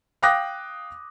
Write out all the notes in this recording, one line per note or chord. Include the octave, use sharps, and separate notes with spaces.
F5 G5 D6 D#6 F#6 A#6